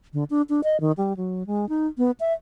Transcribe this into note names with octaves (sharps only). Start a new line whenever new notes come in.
D3
D4
D4
D#5
D#3
G3
F#3
G#3
D#4
B3
E5